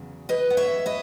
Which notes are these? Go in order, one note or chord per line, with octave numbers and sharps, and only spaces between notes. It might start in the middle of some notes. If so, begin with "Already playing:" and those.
Already playing: E2 C#3 F#3
B4 D#5
F#5
C#5 E5
B4 D#5